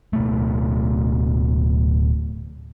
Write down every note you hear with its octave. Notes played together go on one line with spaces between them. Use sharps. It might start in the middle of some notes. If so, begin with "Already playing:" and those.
D1 B2 A3